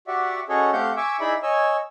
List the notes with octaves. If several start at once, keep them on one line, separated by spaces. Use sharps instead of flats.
F#4 G4 D5 E5 F#5
C#4 F#4 G#4 A4 C#5 D#5
A3 C4 G4 F5 F#5 G6
E5 G#5 C#6 D6 E6
D#4 E4 G#4 D5 E5 B5
C#5 D#5 G#5 E6